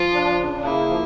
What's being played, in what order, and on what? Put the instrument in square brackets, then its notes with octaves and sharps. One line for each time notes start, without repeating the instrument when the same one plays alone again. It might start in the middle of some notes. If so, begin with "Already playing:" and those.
Already playing: [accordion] F3 [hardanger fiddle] F4
[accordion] D4
C#3
[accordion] A#3 [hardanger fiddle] E4
[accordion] F3